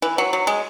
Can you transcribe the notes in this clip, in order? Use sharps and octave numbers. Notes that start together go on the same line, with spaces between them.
E3
F#3
F#3
G#3